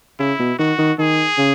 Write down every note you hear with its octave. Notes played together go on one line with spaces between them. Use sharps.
C#3 E4
B2
D#3 F#4
D#3
D#3 G#4
C#3